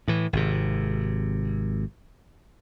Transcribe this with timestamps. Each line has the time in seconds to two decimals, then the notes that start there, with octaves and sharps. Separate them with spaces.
0.08 A2 E3
0.33 G#1 C3